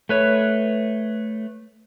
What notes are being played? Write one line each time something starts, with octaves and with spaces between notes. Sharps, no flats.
A3 B4 C#5